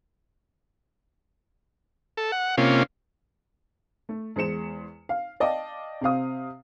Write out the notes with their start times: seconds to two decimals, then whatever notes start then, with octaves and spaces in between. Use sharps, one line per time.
2.17 A4
2.32 F#5
2.57 C3 A#3 C#4 F4
4.09 A3
4.36 E2 G#3 C5 C#7 E7
5.09 F5
5.40 D5 D#5 F5 G5 A5
6.01 C3 C4 F5 D#6